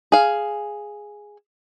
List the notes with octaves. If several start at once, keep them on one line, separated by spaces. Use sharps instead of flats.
G#4 F5